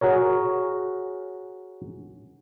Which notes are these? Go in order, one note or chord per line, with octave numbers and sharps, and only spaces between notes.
F#4 G#4 A#4 C#5